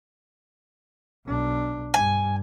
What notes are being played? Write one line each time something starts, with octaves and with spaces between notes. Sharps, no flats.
B1 D4
G2 G#5